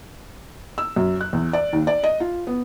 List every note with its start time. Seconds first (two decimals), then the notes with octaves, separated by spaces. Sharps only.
0.78 E6
0.96 F#2
1.21 F#6
1.33 E2
1.53 D5
1.73 D#2
1.87 D5
2.03 D#5
2.20 F4
2.47 B3